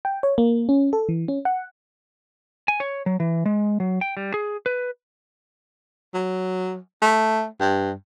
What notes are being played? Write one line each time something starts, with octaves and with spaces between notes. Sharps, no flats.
G5
C#5
A#3
C#4
A4
E3
C#4
F#5
G#5
C#5
F#3
E3
G#3
F#3
G5
G3
G#4
B4
F#3
A3
G2